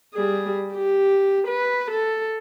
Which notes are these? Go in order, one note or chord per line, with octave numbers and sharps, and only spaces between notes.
G3 G#4
G4
B4
A4